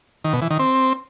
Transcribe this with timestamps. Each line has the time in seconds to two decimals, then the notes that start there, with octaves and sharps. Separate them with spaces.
0.24 D#3
0.33 B2
0.42 E3
0.50 D#3
0.59 C4